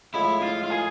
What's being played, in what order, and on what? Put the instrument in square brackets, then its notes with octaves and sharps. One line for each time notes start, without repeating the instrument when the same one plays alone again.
[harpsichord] A2 F3 G#3 [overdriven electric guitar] E4
[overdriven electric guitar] F4
F4
G#4